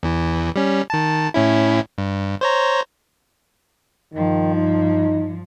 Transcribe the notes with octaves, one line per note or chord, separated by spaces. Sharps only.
E2 E3
G3 C#4
D#3 A5
A2 C#4 E4
G2
C5 C#5 A#5
G2 D#3 F3
D#4